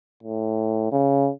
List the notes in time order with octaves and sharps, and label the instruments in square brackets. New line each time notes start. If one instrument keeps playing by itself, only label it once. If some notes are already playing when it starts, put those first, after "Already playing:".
[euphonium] A2
C#3